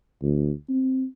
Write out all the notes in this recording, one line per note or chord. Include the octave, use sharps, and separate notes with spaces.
D2
C4